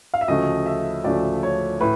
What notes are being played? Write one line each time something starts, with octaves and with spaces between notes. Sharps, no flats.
F5
E5
D2 C#3 F3 A3 D#5
E5
D2 C#3 F3 A3 D5
C#5
A2 B4